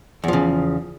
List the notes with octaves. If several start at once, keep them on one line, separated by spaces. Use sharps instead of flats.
E2 C#3 F3